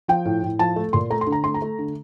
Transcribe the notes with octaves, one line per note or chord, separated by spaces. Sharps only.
F3 G5
A2
A2
F3 A5
A3
A#2 C6
A3 A#5
C6
D3
A#5
A3 C6
A#5
A3
D3